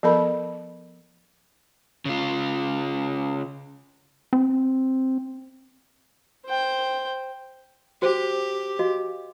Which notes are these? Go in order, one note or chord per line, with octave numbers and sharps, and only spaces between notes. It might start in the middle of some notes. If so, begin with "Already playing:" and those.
F3 B3 A4 A#4 B5
C#3 F4
C4
C5 G5
F#4 G4 C5
F#4 D#5 F5